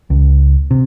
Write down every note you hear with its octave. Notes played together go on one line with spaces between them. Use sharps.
C#2
C3